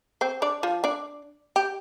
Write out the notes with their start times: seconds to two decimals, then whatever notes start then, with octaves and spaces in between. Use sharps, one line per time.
0.21 C4 C5
0.42 D4 D5
0.63 F3 F4
0.84 D4 D5
1.56 G4